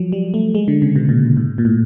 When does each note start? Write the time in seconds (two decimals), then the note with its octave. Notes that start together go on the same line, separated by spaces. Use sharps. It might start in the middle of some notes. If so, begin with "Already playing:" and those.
Already playing: F3 F#3
0.12 G3
0.34 A3
0.55 G#3
0.68 D3
0.82 C#3
0.95 B2
1.09 A#2
1.37 G#2
1.58 A#2
1.65 A2